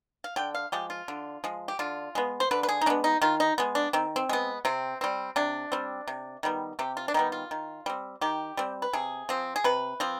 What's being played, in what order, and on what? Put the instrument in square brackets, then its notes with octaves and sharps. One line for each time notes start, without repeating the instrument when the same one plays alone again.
[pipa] F5
D3 G5
F5
F3 G#3 G4
F4
D3
F3 G#3
G4
D3 F4
G#3 B3
C5
D3 B4
B4
G#4
D#4
G#3 B3 D4
D#4
D#3 F4
D#4
G#3 B3
D4
D#3 C4
C4
G#3 B3
C3 C4
G3 C4
C3 D4
G3 C4
C3
D#3 G3 B3
C3 G4
F4
D4
D#3 G3 B3 D#4
F4
D#3
G3 C4
D#3 G4
G3 C4
B4
C3 G#4
F3 C4
G#4
C3 B4
F3 C4